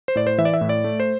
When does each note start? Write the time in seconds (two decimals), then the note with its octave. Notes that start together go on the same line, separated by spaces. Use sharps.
0.08 C5
0.15 A2 D5
0.27 C5
0.38 E3 E5
0.45 D5
0.54 E5
0.61 A2
0.69 D5
0.84 A3
1.00 C5